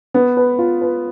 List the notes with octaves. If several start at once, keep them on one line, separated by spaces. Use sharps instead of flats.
B3
B4
F4
B4